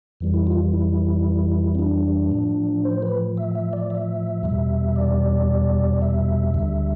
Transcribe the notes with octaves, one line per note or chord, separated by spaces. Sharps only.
F2 E3 G3
E4
F4
E4
C4
D4
A2 F3
C5
B4
E5
E5
D5
E5
E2 B2 G3
D5
D5
E5
D2 D3 G3